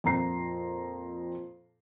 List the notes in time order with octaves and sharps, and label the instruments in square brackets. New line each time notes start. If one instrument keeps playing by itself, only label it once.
[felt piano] F2 A#2 A#5 C7